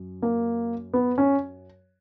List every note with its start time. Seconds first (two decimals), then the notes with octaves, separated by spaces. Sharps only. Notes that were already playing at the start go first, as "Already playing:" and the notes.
Already playing: F#2
0.22 A#3
0.93 B3
1.18 C#4